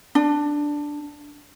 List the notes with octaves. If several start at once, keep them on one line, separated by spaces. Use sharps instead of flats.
D4